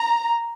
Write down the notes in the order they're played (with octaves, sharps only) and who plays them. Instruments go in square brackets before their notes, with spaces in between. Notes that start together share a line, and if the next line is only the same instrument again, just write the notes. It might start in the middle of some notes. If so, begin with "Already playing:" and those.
Already playing: [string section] A#5